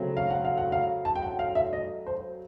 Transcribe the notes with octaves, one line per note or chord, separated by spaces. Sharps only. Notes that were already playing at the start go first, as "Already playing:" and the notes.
Already playing: C#3 F#3 A3 C4
F5
F#5
F5
F#5
F5
A5
G5
F#5
F5
E5
D#5
C5